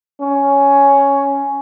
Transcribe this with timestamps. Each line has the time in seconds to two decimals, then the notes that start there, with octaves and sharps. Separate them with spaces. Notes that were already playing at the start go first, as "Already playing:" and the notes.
0.20 C#4